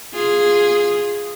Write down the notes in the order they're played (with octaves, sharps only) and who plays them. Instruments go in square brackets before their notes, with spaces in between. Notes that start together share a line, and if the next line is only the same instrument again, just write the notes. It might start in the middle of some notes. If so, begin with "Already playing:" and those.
[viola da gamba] F4 G#4